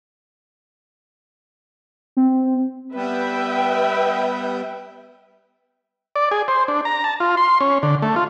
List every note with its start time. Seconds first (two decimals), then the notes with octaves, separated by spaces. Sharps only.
2.17 C4
2.95 G3 B3 B4 E5 G5
6.16 D5
6.31 G#4
6.48 C5
6.68 D4
6.85 A#5
7.04 A5
7.20 F4
7.37 C6
7.61 C#4
7.83 D3
8.02 A3
8.16 F4